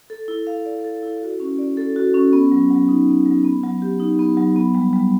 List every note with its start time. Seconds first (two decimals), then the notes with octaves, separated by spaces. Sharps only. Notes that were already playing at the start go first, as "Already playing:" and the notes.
0.10 A4
0.28 E4
0.47 F5
0.66 D5
0.84 A4
1.03 E4
1.21 F#4
1.40 C#4
1.59 D5
1.77 A4
1.96 F#4
2.14 C#4
2.33 B3
2.52 F#3
2.70 F#3
2.89 D#4
3.08 B3
3.26 F#3
3.45 B3
3.63 F#3
3.82 G4
4.00 D#4
4.19 B3
4.37 F#3
4.56 B3
4.75 G3
4.93 G3